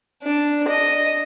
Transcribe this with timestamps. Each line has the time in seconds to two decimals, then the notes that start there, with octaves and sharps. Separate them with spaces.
0.23 D4
0.68 D#5